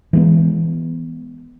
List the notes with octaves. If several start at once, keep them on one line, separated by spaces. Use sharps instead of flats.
E3 G#3 B3